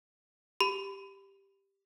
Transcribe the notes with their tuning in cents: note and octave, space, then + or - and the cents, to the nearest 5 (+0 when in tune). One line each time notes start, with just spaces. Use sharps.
G4 +0 B5 +30